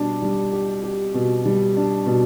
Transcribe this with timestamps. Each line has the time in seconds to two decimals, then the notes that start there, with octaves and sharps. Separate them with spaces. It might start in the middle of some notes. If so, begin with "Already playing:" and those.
Already playing: B2 G3 D4
0.22 G3
0.52 G4
0.83 G4
1.14 B2
1.45 G3
1.77 D4
2.06 B2